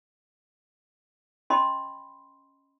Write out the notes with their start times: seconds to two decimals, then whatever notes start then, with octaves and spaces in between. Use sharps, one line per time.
1.50 C#4 D#5 B5 C6